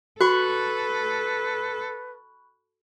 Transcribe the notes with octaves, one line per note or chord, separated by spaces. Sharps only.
F#4 A4 B4 B5 C#6 F#6